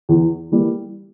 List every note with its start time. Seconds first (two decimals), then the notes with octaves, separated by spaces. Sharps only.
0.09 E2
0.52 E3 G3 A#3